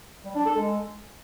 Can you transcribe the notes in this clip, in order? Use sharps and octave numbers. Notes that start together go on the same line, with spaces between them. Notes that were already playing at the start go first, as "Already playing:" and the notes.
G3
D4
A4
G#3